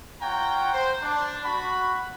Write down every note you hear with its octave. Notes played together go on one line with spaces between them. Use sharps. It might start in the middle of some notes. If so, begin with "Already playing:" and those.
F4 C#5 F#5 G5 A#5
C5
D4
F#4 B5